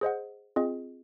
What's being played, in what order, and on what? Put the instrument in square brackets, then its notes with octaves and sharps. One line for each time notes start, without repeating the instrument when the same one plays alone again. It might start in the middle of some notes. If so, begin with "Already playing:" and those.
[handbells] G#4 C5 D#5 F#5
C4 F4 G#4 D#5